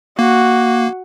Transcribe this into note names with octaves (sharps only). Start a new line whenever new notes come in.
A#3 F#4